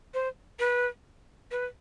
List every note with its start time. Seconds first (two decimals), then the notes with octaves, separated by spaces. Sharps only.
0.14 C5
0.59 B4
1.51 B4